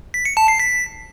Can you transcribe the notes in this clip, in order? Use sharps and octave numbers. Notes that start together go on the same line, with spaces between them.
B6
C#7
A5
C7
B6